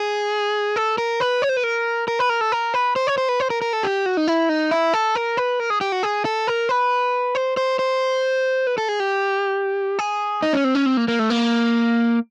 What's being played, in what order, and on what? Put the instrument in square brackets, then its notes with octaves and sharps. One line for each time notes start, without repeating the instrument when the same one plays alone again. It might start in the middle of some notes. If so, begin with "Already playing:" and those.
Already playing: [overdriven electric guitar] G#4
A4
A#4
B4
C#5
C5
B4
A#4
A#4
B4
A#4
A4
A#4
B4
C5
C#5
C5
B4
C5
A#4
A#4
A4
G4
F#4
D#4
E4
D#4
E4
A4
A#4
B4
A#4
G#4
G4
F#4
G#4
A4
A#4
B4
C5
C5
C5
B4
A4
G#4
G4
G#4
D#4
C#4
C4
C#4
C4
A#3
A#3
A3
A#3